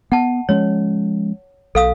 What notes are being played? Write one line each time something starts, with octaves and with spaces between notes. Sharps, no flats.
B3 F#5 A5
F3 G#3 C#4 C#5
B1 A4 F5 D#6